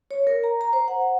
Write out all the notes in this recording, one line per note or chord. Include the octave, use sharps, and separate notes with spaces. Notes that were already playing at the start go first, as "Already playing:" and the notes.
C#5
A#4
A#5
A#5
C5
F#5